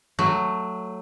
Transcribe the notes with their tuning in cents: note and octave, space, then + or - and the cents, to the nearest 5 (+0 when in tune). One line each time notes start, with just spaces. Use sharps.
F#3 +0 A3 +10